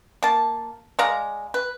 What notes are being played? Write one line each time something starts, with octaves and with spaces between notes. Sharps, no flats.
A#3 A5
G#3 D5 F5 A#5
B4